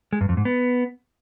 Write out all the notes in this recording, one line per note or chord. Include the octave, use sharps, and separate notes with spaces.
G#3
G2
F2
G#2
B3